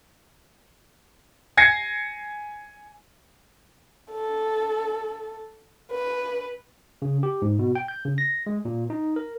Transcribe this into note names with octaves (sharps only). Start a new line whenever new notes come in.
G#5 G#6 A#6 C7 C#7
A4
B4
C#3
G4
G#2
B2
G5
G6
C#3
A#6
G#3
A#2
D#4
A#4